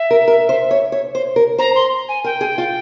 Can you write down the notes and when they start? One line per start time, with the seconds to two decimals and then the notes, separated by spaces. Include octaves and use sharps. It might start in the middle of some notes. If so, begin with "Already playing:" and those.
Already playing: E5
0.11 A#4
0.28 A#4
0.49 C5
0.71 C#5
0.92 C#5
1.15 C5
1.36 A#4
1.58 C5 A#5
1.75 C6
2.08 G#5
2.24 A#4 G5
2.41 G#4
2.58 F4